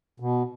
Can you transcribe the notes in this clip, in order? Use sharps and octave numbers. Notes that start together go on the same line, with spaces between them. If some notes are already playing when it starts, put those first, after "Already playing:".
B2